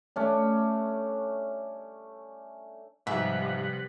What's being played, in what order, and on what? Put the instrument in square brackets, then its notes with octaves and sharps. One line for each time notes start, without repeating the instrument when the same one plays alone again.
[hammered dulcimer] A3 C#4 D4
[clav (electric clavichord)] G#2 [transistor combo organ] C3 B4 F#5 [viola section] F3 G3 [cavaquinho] E5